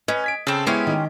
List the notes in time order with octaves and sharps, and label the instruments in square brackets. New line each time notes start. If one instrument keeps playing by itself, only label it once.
[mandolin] C#4 [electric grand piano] B4 [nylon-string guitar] D#5
[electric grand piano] G#6 B6 D7
[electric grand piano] C#3 [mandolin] C4 A4
[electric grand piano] G#3 B3 E4 [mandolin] C#4 G4 C6 [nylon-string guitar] C5
[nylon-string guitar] D#3 D#4